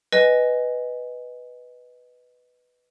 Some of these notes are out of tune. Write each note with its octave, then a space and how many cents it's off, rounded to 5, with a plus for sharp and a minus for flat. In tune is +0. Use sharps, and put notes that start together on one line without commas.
B4 +0 D#5 +0 G#5 +0